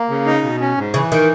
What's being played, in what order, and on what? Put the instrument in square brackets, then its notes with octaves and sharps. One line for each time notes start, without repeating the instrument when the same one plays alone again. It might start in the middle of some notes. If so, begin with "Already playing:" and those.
Already playing: [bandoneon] A#3
C#3
D#4
B2
C#4
G#2
[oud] C#3 [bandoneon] E3
[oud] D#3